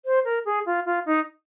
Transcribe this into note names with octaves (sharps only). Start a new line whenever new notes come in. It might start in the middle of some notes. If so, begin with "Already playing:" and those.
C5
A#4
G#4
F4
F4
D#4